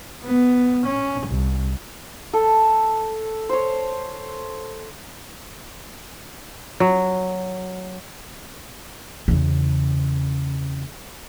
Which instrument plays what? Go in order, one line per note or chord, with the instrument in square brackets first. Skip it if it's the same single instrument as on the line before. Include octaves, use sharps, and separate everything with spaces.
[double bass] B3
C#4
C2
[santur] A4
C5 C#5
[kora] F#3
[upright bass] E2 C#3